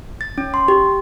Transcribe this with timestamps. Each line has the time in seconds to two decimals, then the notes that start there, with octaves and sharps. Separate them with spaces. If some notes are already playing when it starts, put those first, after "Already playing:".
0.21 A6
0.38 C#4
0.54 C6
0.68 G4